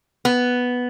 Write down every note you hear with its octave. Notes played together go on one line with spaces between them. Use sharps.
B3